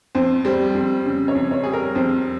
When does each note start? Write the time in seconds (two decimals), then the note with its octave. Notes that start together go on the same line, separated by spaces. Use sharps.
0.15 F2 C5
0.45 G3 C5
0.75 F2
1.06 C#3
1.28 C#5
1.35 F2
1.51 C#5
1.63 G3 G#4
1.73 A#4
1.95 F2 C5